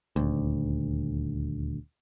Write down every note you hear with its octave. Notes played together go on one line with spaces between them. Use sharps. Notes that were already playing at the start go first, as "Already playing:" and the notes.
D#1 D2